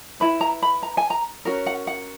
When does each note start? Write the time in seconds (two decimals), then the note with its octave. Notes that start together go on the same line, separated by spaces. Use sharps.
0.20 E4 B4 B5
0.41 A#5
0.62 B5
0.83 A#5
0.97 G#5
1.10 A#5
1.45 C#4 F#4 A#4
1.66 F#5
1.87 F#5